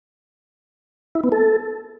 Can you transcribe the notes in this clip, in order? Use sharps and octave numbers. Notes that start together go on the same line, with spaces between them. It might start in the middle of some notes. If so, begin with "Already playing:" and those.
E4
B3
A4